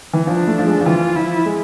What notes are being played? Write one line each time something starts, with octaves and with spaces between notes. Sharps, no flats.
E3
F3 D4
A3
F3
G#3
F3
E3 F4
F3 E4
G#3